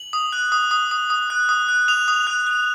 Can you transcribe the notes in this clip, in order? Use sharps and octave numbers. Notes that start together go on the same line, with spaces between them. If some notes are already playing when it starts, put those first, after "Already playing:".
Already playing: F#7
D#6
F#6
D#6
D#6
D#6
D#6
F#6
D#6
F#6
D#6 F7
D#6
F#6
F#6